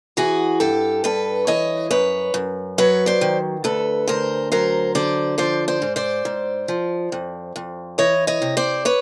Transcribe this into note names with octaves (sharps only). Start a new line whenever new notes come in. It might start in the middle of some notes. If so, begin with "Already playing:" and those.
E3 F#4 G#4
G2 G4 A4
G2 A4 B4
E3 C#5 D#5
F#2 B4 C#5
F#2
F#3 B4 C#5
C5 D5
D#3
D2 A4 B4
D2 A#4 C5
F#3 A#4 C5
D3 C5 D5
F3 C5 D5
C5 D5
G#2
C5 D5
G#2
F3
F2
F2
E3 C#5 D#5
C#5 D#5
C3
C5 D5
B4 C#5